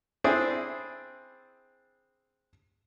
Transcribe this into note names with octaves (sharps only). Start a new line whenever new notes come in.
C4 D4 E4 G#4